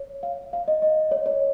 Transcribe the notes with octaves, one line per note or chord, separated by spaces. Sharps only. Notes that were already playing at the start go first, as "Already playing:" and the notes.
Already playing: C#5
F5
F5
D#5
D#5
C#5
C#5